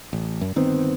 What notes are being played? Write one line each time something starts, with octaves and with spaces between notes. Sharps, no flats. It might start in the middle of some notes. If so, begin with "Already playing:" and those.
A1
F#2
G1 D#3 B3 C4